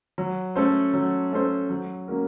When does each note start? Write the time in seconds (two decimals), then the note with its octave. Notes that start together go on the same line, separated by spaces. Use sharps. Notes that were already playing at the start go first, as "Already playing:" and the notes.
0.18 F#3
0.56 A3 C#4 A4 C5
0.94 F#3
1.32 A3 C#4 A4 C5
1.70 F#3
2.08 A#3 C#4 F#4 A#4